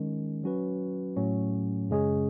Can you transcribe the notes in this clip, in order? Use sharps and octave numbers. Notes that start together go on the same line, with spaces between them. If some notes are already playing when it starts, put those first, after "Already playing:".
Already playing: D#3 G#3 C#4
F#3 C#4 F#4 B4
A2 F#3 A3 C#4
F#2 C#3 G#3 C#4 G#4